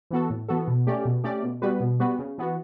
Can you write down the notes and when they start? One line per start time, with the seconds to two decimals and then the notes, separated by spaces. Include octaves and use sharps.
0.11 E3 B3 F#4 A4
0.30 A2
0.49 E3 B3 F#4 A4
0.67 B2
0.87 A3 C#4 G4 D5
1.05 B2
1.24 A3 C#4 G4 D5
1.43 B2
1.62 G3 B3 F#4 B4
1.80 B2
1.99 G3 B3 F#4 B4
2.19 C#3
2.38 E3 B3 F#4